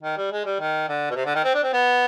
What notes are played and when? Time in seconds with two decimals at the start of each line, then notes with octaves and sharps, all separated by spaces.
0.03 D#3
0.17 G3
0.32 G#3
0.46 G3
0.60 D#3
0.88 D3
1.11 B2
1.16 C3
1.25 D3
1.35 D#3
1.44 C4
1.54 D4
1.63 C4
1.73 B3